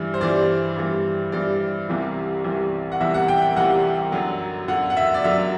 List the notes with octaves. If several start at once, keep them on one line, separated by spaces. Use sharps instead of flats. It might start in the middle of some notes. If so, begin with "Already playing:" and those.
Already playing: G2 E3 G3
C5
G2 E3 G3 D5
G2 E3 G3
G2 E3 G3 D5
C2 C3 E3 G3
C2 C3 E3 G3
F#5
C2 C3 E3 G3 E5
F#5
G5
G5
C2 C3 E3 G3 F#5
F#2 D3 F#3
F#2 D3 F#3 F#5
F#5
E5
D5
F#2 D3 F#3 E5